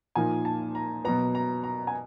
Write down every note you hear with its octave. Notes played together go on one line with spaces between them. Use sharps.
A#2 F3 A#3 D#4 G#5
A5
A#5
B2 F#3 B3 A#5
A#5
A#5
G#5